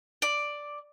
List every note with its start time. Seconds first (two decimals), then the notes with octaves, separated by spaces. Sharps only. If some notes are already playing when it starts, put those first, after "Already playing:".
0.22 D5